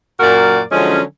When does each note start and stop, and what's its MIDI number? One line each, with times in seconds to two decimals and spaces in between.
0.20 0.60 42
0.20 0.60 46
0.20 0.60 58
0.20 0.60 66
0.20 0.60 70
0.20 0.60 74
0.72 0.99 50
0.72 0.99 53
0.72 0.99 54
0.72 0.99 56
0.72 0.99 61